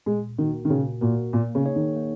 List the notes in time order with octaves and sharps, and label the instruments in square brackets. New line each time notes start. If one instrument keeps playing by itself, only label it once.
[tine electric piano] A#2 [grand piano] G#3
[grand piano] D#3 [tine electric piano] A#3 F#4 A#4
[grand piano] D#3
[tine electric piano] A#2 [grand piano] C#3
[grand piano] A#2 [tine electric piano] A#3 F#4 A#4
[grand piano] A#2 [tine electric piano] A#3
[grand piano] C#3
[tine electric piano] D#4 G#4 C#5
[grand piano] D#3
[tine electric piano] A#3